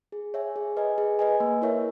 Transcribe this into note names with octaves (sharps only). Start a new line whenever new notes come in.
G#4
C#5 E5 G#5
G#4
B4 D#5 G#5
G#4
B4 D#5 G#5
A#3
E4 A#4 C#5 E5